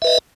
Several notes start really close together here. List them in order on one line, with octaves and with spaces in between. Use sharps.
E5 B4 D#5